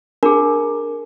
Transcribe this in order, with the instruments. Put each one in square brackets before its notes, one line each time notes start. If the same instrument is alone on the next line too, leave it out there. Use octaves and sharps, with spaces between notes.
[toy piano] D4 G#4 [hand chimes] A#4